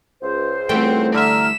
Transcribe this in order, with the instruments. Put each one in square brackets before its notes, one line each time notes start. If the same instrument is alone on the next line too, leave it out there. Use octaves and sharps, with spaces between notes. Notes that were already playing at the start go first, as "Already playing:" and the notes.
[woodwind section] C#2 C5
[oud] E3 G3 A3 [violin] C4 F#5 [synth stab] G5
[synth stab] D3 E5 [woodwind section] A#5 F6 [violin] B6 E7